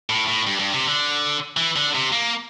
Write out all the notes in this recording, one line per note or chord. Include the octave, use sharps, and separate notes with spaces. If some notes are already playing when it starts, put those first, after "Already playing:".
A2
A2
G2
G2
C3
D3
E3
D3
C3
A#3